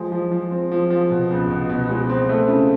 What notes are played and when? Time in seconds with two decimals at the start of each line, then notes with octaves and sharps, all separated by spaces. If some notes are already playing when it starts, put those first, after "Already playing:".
Already playing: F3 G#3
0.12 F3
0.31 F3
0.51 C4
0.71 F3
0.90 F3
1.10 B2
1.31 C#2
1.51 B2
1.69 B2
1.90 G#3
2.09 C4
2.29 A3
2.48 C#3